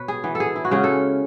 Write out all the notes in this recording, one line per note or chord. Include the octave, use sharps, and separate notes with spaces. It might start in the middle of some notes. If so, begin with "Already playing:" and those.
Already playing: B2 B4 C#5
G#4
E3 B3
A4
G#4
E4
F#4
C#3 G#3 C#4 G#4
A4